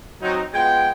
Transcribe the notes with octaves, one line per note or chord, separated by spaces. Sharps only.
F#3 C4 D#4
G#3 B3 F4 G5